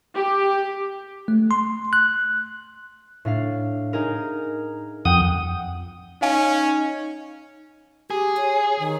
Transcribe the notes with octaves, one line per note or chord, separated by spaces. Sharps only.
G4
A3
C6
F#6
A2 D4 F5
D#4 G#4 A#4
F2 F#5 G5 D#6
C#4 D#4 F5 G#5
G4 G#4
C#5
D#3